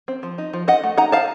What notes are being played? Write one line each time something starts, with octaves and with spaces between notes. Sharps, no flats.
C4
F3
D#4
F3
D#4 D#5 F#5
A3
D#4 F#5 A#5
D#4 F5 A5